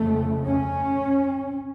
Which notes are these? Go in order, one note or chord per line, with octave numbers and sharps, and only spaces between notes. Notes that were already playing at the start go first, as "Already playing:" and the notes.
Already playing: F2 C#3 A3
C#4